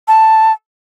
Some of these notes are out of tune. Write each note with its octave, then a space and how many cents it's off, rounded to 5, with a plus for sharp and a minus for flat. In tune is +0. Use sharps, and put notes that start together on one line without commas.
A5 +5